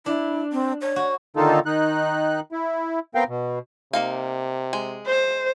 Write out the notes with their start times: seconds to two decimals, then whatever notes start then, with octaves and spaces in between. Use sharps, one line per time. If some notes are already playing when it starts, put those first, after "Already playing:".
0.06 D4 E4
0.52 C4
0.81 C#5
0.96 F#4
1.36 D3 D#3 A#3 D#4 F4 A4
1.66 D#3 D#4 F#6
2.52 E4
3.15 B3 C4 A#4 F5 G5
3.28 B2
3.93 C3 A#3 D#4 F5
4.73 G#3
5.07 C5